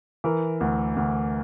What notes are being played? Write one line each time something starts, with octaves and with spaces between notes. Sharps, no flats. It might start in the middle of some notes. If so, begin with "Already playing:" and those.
E3 A#4
D2
D2